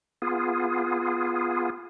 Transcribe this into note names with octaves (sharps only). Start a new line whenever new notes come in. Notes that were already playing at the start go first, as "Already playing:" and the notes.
B3 F4 G#4